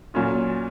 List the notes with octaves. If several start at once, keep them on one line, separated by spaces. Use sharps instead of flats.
A#2 F#3 C#4 F4